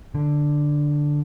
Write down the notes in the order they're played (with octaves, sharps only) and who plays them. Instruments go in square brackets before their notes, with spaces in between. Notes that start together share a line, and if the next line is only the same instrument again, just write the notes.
[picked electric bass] D3